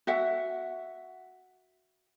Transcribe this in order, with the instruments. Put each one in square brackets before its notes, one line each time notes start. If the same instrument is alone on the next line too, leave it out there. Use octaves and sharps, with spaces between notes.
[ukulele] F#4 E5 F#5